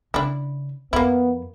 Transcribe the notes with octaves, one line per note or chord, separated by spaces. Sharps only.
C#3 D4 E4
F2 A#3 B3 E4